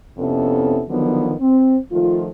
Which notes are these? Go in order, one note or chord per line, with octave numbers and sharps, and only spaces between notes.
F2 C3 B3 C#4 E4 A4
D3 D#3 F3 F#3 B3
C4
D#3 F3 A3 F4